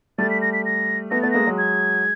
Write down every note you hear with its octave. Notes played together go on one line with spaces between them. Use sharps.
G3 A3 A6
B6
A#6
B6
A#6
A3 B3 A#6
A3 B3 A6
G#3 A#3 A#6
F#3 G#3
G#6